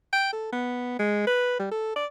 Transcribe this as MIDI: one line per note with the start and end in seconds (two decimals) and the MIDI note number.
0.13 0.31 79
0.33 0.51 69
0.52 0.95 59
0.99 1.25 56
1.27 1.59 71
1.59 1.67 55
1.71 1.94 69
1.96 2.06 74